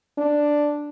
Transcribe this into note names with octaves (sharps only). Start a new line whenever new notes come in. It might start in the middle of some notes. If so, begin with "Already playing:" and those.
D4